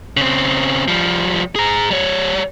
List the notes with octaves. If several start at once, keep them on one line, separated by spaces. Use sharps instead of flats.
C#3 C4
F3 G3
G#4 A#5
G3 C#5